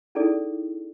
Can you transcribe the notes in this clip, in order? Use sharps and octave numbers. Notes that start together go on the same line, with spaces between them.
C#4 D#4 E4 G#4 A4 D5